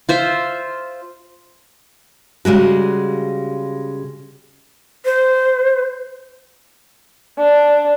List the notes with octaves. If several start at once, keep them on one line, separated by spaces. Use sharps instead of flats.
F4 C5 E5
C#3 G3 G#3 F#4
C5
D4